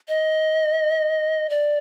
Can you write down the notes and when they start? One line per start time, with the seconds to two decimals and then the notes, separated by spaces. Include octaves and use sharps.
0.08 D#5
1.50 D5